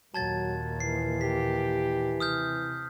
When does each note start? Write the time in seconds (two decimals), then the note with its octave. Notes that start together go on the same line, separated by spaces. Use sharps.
0.14 D#2 A#2 F#3 A5 G#6 A6
0.80 E3 C7
1.21 G4 B6
2.20 C3 D#6 F6 G6